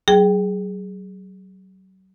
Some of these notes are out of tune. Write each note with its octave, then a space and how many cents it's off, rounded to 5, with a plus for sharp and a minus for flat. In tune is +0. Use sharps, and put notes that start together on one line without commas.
F#3 +35 G#4 +0 G5 +0